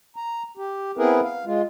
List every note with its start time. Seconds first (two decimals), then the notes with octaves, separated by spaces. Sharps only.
0.16 A#5
0.57 G4
0.98 B3 C4 E4 G#4 A#4 B4
1.23 F5
1.46 G#3 F4